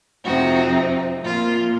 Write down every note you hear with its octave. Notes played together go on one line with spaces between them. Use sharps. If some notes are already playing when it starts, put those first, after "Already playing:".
F2 C3 F3 C4 D#4 F#4
A#2 F3 A#3 F4